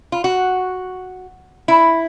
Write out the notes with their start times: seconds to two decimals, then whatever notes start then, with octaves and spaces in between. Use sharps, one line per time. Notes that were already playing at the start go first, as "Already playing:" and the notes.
0.12 F4
0.24 F#4
1.68 E4